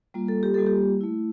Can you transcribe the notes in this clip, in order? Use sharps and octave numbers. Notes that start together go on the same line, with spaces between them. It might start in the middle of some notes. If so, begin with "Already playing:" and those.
G3 A#3 F4
A4
G4
G3 A#3 F4 A4
G4
A3 E4